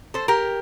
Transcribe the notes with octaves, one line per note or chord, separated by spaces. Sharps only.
A4 C5
G4 A#4